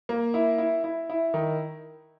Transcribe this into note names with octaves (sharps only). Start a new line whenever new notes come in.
A#3
E4
E4
E4
E4
D#3